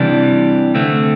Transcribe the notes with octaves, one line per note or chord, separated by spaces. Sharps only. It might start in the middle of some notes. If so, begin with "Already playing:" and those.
Already playing: C3 E3 G3 D4
D3 A3 C4